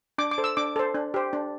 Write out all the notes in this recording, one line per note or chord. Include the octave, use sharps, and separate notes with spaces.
D4 D6
D6
A4 C5
E6
D4 D6
A4 C5
D4
G4 C5
D4